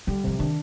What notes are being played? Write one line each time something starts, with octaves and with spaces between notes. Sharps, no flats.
D3 G3
C3 F3
D#3 D4